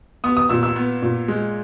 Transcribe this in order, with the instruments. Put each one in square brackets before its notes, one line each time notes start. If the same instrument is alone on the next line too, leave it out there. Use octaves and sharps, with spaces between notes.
[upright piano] B3 D#6
D#6
A#2 E6
E6
B3
A#2
G#3